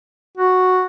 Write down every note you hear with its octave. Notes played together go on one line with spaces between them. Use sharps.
F#4